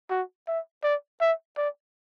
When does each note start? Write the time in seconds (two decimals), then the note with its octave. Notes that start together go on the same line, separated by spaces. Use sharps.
0.11 F#4
0.48 E5
0.84 D5
1.21 E5
1.57 D5